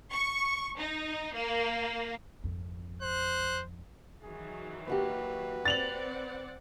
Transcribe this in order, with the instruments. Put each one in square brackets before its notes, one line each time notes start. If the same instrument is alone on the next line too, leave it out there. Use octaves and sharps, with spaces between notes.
[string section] C#6
D#4
A#3
[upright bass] G#1 F2
[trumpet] C5 [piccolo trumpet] F#6
[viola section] D#3 E3 F#3 [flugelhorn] G#4
[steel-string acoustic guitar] A#3 F#4 G4 [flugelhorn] B4
[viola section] C4 D5 F#5 [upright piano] A6 F7 F#7